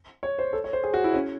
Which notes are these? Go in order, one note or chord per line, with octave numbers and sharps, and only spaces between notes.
C#5
C5
A4
C#5
C5
G#4
F#4
E4
C#4